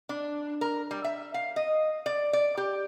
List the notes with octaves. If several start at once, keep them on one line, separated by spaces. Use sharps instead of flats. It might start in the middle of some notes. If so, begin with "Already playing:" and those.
D4
A#4
G3
E5
F5
D#5
D5
D5
G4